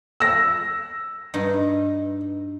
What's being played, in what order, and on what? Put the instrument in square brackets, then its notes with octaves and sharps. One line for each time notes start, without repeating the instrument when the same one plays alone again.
[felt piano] E6 A#6
[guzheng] G2 D#4